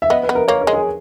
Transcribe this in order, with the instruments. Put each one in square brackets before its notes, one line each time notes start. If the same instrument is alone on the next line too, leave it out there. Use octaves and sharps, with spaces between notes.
[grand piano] E5
[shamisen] B3 [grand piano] D#5
[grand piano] B4
[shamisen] B3
[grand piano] A#4
[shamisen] A#3 [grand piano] C#5
[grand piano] A#4
[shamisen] G#3
[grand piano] G#4